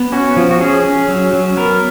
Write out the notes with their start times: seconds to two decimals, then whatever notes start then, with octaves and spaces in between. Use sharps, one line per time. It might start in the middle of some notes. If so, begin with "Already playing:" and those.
Already playing: B3
0.12 C#4 F#4
0.36 F3
0.51 F#4
0.61 C#4 G#4
0.85 C#4
1.08 F#3
1.33 F#3
1.57 B3 A#4